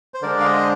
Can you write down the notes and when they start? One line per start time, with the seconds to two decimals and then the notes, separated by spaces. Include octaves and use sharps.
0.14 C5
0.22 D3 G#3 D4 A#4 D5
0.40 F5
0.45 C5 D#5